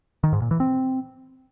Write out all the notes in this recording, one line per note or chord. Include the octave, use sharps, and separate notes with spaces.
D#3
G#2
A#2
E3
C4